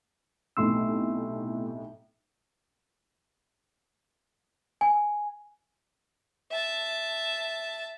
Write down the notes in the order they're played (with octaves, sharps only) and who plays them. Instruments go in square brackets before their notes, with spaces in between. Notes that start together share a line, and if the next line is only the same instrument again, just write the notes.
[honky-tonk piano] B1 A2 C3 [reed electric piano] A3 C6 E6
[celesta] G#5
[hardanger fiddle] E5 A5